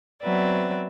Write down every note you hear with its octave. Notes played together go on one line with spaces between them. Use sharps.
F#3 B3 C4 B4 D5 E5